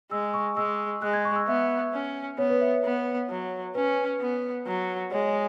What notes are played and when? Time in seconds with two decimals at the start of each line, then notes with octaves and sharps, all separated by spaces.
0.11 G#3 E6
0.34 C#6
0.56 G#3 E6
1.02 G#3 F#6
1.13 G#6
1.25 C#6
1.36 E6
1.47 B3 E5
1.93 C#4
2.38 B3 C#5
2.50 B4
2.61 E5
2.73 C#5
2.84 B3
3.30 F#3
3.75 C#4 B4
4.20 B3
4.67 F#3
5.12 G#3 C#5